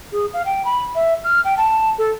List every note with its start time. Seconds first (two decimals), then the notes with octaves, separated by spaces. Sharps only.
0.12 G#4
0.33 F5
0.46 G5
0.65 B5
0.95 E5
1.24 F6
1.45 G5
1.57 A5
1.98 A4